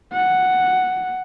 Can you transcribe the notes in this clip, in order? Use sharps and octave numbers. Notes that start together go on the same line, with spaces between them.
F#5